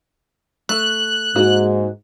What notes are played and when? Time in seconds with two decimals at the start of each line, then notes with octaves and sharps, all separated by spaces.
0.69 A3 F#6
1.36 G#2 A#3 F#4